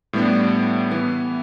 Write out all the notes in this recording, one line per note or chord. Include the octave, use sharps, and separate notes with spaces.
A2 G3 B3 D4
E3 B3 E4